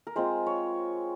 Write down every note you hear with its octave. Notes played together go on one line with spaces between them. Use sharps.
A#4
G#3 C4 F4 C5
C#5